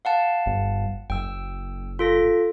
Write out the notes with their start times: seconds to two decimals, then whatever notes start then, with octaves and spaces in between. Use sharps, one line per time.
0.05 F5 F#5 A5
0.46 G1
1.10 F#1 G5 E6
1.99 F4 A4 A#6